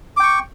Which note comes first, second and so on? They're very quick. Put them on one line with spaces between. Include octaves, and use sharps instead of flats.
D6 G5 C#6